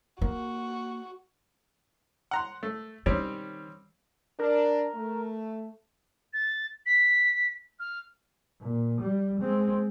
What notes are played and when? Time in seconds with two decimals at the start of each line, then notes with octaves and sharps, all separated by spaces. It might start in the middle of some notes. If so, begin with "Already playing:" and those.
0.21 A#3 F#4
2.31 F#5 A#5 C6
2.63 A3
3.06 D#3 G3 C4 C#4
4.39 D4 A#4
4.94 A3
6.33 A6
6.86 B6
7.79 F6
8.60 A#2
9.01 G3
9.41 G#3 C4